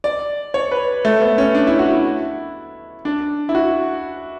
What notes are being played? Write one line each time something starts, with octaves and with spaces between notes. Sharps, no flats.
D5
C#5
B4
A3
B3
C#4
D4
E4
F#4
E4
D4
E4
F#4